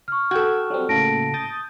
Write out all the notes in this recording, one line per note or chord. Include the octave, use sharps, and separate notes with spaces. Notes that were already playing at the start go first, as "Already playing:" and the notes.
C#6 F6
F#4 A4 G5 G#6
F#3 G3 C4
A2 C#3 A#3 A5 A#6 D7
D#6 G6 A6